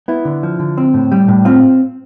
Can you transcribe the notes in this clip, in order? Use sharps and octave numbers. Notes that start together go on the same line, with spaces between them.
B3 E4
D3
F3
D3
C4
A2
G3
A2
C4 F4